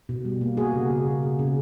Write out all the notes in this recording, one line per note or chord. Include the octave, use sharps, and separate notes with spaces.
B2
G3
A#3
A#3 F#4 G#4
C#3
C#3
C#3
C#3
C#3